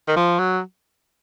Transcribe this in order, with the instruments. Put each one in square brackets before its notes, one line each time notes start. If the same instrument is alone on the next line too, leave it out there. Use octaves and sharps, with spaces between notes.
[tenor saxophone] D#3
F3
F#3